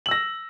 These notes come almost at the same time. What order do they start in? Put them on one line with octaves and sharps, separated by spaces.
F#7 E6 A#6